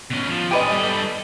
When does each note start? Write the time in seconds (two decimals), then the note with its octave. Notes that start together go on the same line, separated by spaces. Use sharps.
0.10 B2 C#4
0.28 F3
0.51 D4 G4 B4 D#5 G#5
0.70 G3 A4